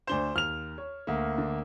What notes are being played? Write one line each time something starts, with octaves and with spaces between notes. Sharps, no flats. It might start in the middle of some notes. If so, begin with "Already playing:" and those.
D2 D4 C5 E7 G7
D#2 F6 F7
C#5
D2 A#3
D3